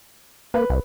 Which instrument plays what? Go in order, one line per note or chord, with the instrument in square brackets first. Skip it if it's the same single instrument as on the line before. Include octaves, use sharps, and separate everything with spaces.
[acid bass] A#3 [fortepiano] B4
[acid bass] C2